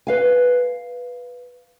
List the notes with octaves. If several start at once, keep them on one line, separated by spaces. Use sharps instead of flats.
B4 F5 G#5